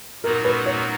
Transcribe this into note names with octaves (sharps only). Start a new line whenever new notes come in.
A#2 F#3 B3 D#4 F#4 A#4
B4
C#5